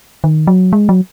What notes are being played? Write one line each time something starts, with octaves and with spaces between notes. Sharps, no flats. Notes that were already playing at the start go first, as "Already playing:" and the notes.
D#3
F#3
G#3
F#3